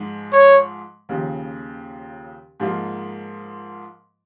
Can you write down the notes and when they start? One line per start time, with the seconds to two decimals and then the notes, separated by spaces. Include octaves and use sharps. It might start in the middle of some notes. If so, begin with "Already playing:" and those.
Already playing: G#2 F3 G#3
0.33 C#5
1.09 D#2 C#3 F3
2.60 G#2 F3 A#3 F4